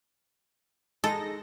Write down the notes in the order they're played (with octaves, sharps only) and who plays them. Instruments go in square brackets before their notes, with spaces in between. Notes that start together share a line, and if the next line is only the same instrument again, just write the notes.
[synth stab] G#3 D#4 A#6 [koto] A4